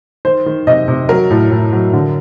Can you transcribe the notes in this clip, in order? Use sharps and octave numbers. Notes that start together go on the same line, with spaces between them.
D#3 C5
D#3
C3 D#5
C3
F#3 A#4
A2
A2
F#3
D3